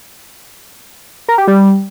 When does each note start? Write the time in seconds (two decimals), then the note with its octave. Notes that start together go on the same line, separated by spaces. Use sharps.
1.28 A#4
1.38 G4
1.48 G3